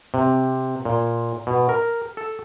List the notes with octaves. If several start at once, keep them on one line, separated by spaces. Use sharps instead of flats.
C3
A#2
B2
A#4
A4